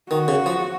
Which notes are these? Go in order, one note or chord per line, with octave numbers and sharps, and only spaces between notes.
D#3 F#4
C#3
F3